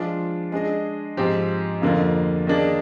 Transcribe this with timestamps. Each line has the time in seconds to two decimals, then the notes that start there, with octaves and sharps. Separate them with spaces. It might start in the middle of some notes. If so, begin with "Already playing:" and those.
Already playing: F3 G#3 D4 F4
0.52 G#3 D4 G#4 D#5
1.17 G#2 F3 C4 G4
1.82 F2 D3 F3 A#3 F4
2.47 D#3 A#3 D4 G#4 D5